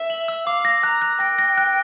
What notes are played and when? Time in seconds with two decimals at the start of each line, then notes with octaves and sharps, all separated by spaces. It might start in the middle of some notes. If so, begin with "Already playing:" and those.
Already playing: E5
0.10 F#7
0.28 E6
0.46 F5 D6
0.65 A#6
0.83 A#5 F#6
1.02 F#6
1.20 G5 A#6
1.39 A#6
1.58 F#6